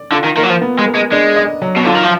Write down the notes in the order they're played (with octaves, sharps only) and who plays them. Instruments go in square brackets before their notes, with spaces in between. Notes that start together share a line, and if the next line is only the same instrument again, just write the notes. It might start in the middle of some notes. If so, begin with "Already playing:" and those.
Already playing: [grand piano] D5
[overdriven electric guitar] D3 [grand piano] F4
[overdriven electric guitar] D#3
[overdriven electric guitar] D#3 [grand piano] A#3
[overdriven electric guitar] F#3
F3
[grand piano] B3
[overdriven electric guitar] G#3
[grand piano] A#4
[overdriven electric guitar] G#3
[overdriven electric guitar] G#3 [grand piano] D4
[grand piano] D#5
F#3
[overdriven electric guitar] B2
[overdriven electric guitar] D3 [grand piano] F4
[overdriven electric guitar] D#3
F3